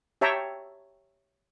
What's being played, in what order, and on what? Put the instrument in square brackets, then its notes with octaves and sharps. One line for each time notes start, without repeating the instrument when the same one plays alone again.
[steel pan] G4 C#5 E5 G5 A5 A#5